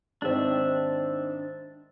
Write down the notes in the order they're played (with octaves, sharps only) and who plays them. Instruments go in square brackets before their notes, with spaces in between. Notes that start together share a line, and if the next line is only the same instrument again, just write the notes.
[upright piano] G#2 D#3 C4 [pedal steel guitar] D4 E5